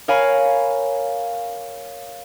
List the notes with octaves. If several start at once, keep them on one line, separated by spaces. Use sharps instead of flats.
A#4 C#5 F5 G#5 B5